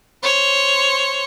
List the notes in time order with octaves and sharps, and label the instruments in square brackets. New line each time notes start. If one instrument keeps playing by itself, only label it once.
[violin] C5 C#5